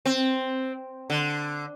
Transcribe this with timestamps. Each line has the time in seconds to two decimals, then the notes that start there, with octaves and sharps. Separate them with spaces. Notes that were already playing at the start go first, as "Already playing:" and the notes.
0.05 C4
1.10 D3